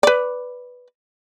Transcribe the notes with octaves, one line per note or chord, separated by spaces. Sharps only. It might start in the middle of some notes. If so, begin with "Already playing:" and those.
B4 D5